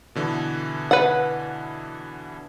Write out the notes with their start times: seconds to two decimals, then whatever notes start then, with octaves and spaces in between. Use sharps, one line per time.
0.15 B2 D3 E3
0.91 B4 F#5